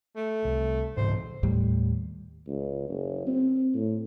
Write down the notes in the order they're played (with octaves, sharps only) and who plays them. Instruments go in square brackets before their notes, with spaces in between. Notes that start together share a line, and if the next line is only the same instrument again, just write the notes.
[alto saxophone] A3
[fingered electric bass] C2
[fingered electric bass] G#2 C#3 E3 [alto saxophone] C5
[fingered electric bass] D#2 A2 G3
[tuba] C#2
F#1
C4
A2